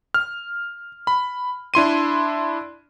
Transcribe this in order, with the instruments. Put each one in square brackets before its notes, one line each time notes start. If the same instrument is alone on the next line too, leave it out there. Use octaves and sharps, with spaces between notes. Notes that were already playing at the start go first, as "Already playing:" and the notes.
[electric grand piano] F6
B5
D4 E4 C6 D#7